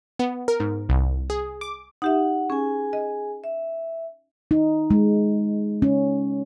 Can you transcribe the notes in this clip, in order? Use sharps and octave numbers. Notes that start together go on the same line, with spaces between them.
B3
A#4
G#2
C2
G#4
D6
D#4 G4 E5 F#5
C#4 G#4 G#5
D#5
E5
D#4
G#3
C#4